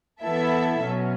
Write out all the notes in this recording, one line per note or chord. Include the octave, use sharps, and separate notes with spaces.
E3 B3 E4 A4 E5
B2 F#3 C#4